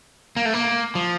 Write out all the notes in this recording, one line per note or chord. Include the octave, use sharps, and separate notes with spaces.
A#3
A3
A#3
F3